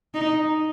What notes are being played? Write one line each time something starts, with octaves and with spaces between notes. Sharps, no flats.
D#4